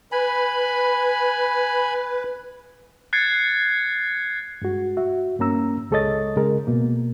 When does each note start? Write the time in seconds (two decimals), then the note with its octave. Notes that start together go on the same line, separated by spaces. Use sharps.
0.12 B4 G#5 B5
3.13 F#6 G#6 A6 C7 C#7
4.62 G2 G#3 F#4
4.97 F#4 E5
5.39 G2 A#3 C#4 A#5 E6
5.91 C#2 G#3 A4 C#5 D#5 A6
6.36 C#3 G#3 A#4
6.67 B2 A#3